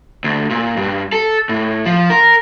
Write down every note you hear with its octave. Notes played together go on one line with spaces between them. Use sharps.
D2
A#2
G2
A4
A2
F3
A#4